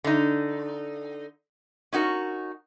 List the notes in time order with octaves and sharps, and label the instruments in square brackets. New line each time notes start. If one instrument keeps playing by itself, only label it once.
[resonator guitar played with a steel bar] D3 D#4
C#4 D#4 F#4 A#4